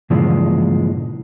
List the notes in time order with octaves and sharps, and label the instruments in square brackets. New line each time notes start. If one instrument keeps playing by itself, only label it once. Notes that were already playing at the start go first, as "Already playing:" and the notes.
[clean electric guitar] G2 A#2 C#3 E3 F3 G#3